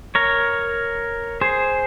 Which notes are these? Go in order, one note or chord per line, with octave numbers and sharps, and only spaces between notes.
A#4 C#5
G#4 C5